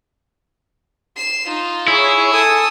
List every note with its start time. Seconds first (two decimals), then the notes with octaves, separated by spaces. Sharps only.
1.17 C7 E7
1.48 D#4 F4
1.88 E4 G#4 C#5
2.32 A4 G#5 D#6 E6